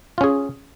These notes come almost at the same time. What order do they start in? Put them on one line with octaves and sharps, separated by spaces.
F4 C#4 G#4